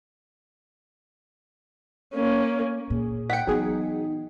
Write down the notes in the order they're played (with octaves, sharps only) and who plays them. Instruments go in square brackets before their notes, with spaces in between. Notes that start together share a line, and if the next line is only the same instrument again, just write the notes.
[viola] A#3 C#4
[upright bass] A#2 [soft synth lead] G#4
[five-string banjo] F#5 G5 [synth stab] B6 C#7 [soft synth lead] D7
[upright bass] E3 B3 [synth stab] F#3 G#4 [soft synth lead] D#4